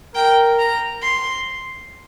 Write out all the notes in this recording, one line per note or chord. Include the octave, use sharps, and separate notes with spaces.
A#4 G5
A#5
C6